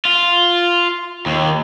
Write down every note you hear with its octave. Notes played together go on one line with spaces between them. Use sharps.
F4
D#2